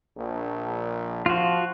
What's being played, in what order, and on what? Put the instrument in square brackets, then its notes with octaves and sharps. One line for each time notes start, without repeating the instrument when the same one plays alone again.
[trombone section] A#1
[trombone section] F3 [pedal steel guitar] F4 F#4